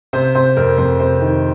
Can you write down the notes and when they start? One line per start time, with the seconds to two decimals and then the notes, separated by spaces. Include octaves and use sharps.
0.13 C3 C5
0.35 C3 C5
0.57 F2 A#4
0.78 F2 C5
0.99 C3 C5
1.21 D#3